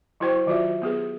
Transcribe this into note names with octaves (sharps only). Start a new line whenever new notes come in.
F#3 E4 F#4 C5 G5 C#6
D#3 F#3 F4 F#4 D5 E5
B3 G4 G#4 B4